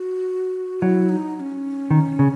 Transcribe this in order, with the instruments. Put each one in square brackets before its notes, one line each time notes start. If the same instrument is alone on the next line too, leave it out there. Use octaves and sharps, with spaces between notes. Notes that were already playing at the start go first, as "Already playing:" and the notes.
Already playing: [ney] F#4
[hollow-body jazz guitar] F#3 [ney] E4
[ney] D#4
D#4
C#4
[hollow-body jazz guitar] D#3
C#3